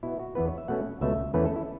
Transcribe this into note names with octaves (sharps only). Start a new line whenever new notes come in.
B2 B3 E4
F#4
E2 E3 B3 B4
C#5
E5
B2 A3 C#4 F#5
C#2 B2 A3 E5
E2 E3 A3 C#4 B4
A4
E4